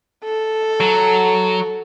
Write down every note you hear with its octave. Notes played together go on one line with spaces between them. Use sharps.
A4
F#3